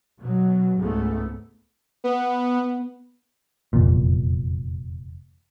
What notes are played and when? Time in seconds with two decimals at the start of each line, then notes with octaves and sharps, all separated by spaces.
0.20 B2 F#3
0.78 C#2 G#2 A3 B3
2.04 B3
3.73 F1 E2 A#2